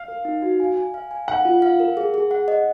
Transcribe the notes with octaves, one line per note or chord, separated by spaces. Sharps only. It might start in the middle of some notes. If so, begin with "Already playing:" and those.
Already playing: F5
A#4
D#4
F#4
G#5
G#5
F5
G#5
F5 F#5
F4
F5
A#4
G#4
G#4
F#5
D#5